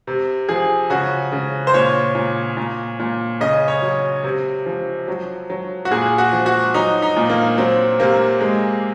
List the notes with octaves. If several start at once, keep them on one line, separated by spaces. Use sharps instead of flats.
C3
F3 G#4
C#3 F#4
C#3
C5
A#2 C#5
A#2
A#2
A#2
C#3 D#5
C#5
F#3
C3
F3
F#3
F#3
F#4
A#2 G#4
F#4
F3
F#4
F#3 D#4
D#4
A#2
A#3
F#3 C4
C3 A#3
G#3